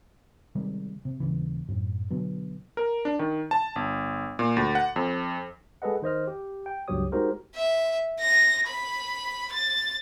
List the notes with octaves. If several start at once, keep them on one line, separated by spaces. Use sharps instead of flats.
C3 D#3 G3 G#3
C3
D#1 D#2 C#3 E3
F#2 A2
B2 D3 F#3 B3
A#4
D4
D#3
A5
G1
A#2
D2
F#5
F2
G#3 G#4 A4 B4 D#5 F#5
D#3 C5 D#5 F6
G4
G5
C#2 G2 F#3 G4 C#5 D#6
G#3 D#4 F#4 G4 A#4 C5
E5
A#6
B5
A6